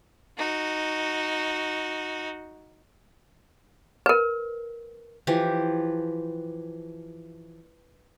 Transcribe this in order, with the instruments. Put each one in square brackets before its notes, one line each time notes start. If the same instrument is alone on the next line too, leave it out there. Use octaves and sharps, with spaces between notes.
[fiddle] D#4 F#4
[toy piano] A#4 B4
[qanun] E3 F3 G4